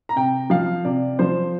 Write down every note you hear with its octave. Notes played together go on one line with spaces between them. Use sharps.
A#5
C3 G5
F3 F5
C3 D5
F3 C5